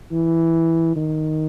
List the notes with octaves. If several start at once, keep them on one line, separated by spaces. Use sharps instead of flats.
E3
D#3